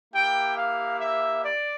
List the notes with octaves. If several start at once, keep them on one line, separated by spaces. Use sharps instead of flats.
A#3 E4 G4 G5
F5
E5
D5